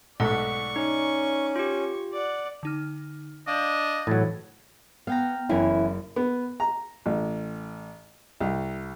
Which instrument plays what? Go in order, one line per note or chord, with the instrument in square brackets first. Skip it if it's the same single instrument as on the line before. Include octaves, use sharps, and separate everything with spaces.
[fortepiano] B1 G#2 A3 [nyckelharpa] D5 C#6 [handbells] F#5
[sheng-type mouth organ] C#4 [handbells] D#4
[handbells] F4 G4 [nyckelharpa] C#6
[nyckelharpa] D5 F#5
[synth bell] D3 D#4 F6
[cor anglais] D4 [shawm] D#5 [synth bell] F5 G6 F#7
[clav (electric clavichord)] A2 F#3 [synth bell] E3 G#6 A6
[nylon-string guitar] B3 [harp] F5 G5 A#5
[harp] F#1 [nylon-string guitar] E3 C#4 E4
[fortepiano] B3
A#5
A1
C2